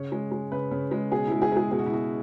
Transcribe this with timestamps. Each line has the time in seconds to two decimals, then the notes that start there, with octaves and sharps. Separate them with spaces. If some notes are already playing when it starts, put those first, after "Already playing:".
Already playing: C#3 C#5
0.12 G#3
0.32 G#3
0.52 C#3 B4
0.71 C#3
0.91 G#3
1.12 B2 G#4
1.27 G#3 E4
1.42 G#4
1.52 G#3 G#4
1.71 B2 G#4
1.79 F#4
1.86 E4
1.92 B2 F#4